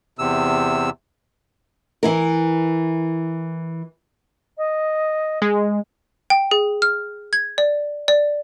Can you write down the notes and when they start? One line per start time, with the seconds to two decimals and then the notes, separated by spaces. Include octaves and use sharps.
0.19 E2 C3 E6
2.03 E3 E4 A#4
4.58 D#5
5.42 G#3
6.30 G5
6.51 G#4
6.82 F6
7.33 G#6
7.58 D5
8.08 D5